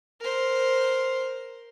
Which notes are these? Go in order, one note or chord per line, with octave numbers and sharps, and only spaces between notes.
A#4 C5